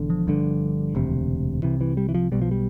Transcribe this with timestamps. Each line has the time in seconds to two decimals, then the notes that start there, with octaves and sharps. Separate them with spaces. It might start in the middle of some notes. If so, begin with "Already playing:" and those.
Already playing: E1 E2 D3
0.10 F3
0.27 G1 G2 D3
0.95 E1 D2 C3
1.63 C2 C3 E3
1.81 E3
1.97 G3
2.09 E3
2.14 F3
2.32 B1 B2 G3
2.42 F3
2.51 G3